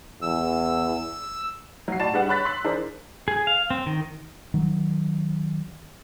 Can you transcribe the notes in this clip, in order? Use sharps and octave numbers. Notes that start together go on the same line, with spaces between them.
E2 E6
F#3 C7
A2 F#4 D5 A5 A6 E7
G3 D4 G#4 B4 F#5
C#5 B5 F#6 A6 B6
C6 E6 B6 F#7
E3 D4 G#4 A#4 C5
G#4
F5
C4
D#3
D#3 F#3